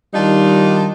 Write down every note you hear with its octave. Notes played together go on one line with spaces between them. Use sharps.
D#3 G3 D4 D#4 F4